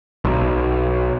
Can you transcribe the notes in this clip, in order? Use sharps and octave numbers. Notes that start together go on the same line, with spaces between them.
B1